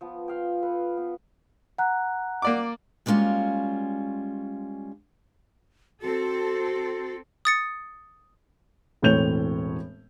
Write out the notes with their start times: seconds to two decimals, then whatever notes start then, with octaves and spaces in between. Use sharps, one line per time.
0.01 F3 B3
0.28 F4 F5 G5
0.62 A4 B4
0.97 B3
1.78 F#5 A#5 F#6
2.42 A#3 D5 D6
3.06 G3 G#3 A#3 C#4 F4 F#4
6.02 C4 F#4 A4
7.45 D#6 A6 C#7
9.02 E1 A2 C4 C#5 G6 F7